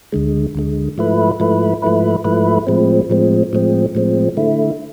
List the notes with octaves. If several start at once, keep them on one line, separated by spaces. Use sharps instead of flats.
D2 D3 G#3
D2 D3 G#3
G#2 F3 A3 E4 B4
G#2 F3 A3 E4 B4
G#2 F3 A3 E4 B4
G#2 F3 A3 E4 B4
A2 F3 G#3 C4
A2 F3 G#3 C4
A2 F3 G#3 C4
A2 F3 G#3 C4
D3 A3 E4